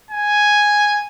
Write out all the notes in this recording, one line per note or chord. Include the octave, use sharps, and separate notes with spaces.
G#5